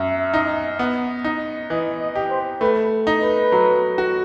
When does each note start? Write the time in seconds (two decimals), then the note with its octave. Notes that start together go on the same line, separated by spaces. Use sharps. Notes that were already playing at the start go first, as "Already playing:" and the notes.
Already playing: F#2 E5
0.33 D#4
0.79 B3
1.24 D#4
1.70 E3 D#5
2.00 D#5
2.15 G4
2.31 C5
2.61 A3 B4
3.07 D#4
3.22 B4
3.52 F#3
3.98 F#4